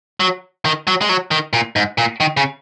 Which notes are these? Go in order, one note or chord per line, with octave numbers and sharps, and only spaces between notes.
F#3
D#3
F#3
G#3
F#3
D#3
A#2
G#2
A#2
D#3
C#3